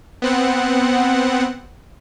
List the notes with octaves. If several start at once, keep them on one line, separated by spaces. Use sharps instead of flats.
B3 C4 F#5